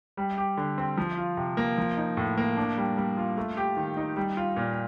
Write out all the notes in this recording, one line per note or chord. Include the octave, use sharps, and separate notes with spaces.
G3
G4
D3
C4
F3
F4
C3
A#3
F3
D#4
A2
A#3
D4
G3
G3
F4
A3
G4
D#3
D#4
G3
F4
A#2